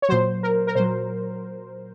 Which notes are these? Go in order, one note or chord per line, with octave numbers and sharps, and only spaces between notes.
C#5
A#2 F#3 C5
A#4
A#4
A#2 F#3 C5